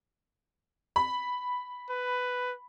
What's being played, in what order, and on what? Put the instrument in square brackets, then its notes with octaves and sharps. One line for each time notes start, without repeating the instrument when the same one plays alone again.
[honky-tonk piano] B5
[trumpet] B4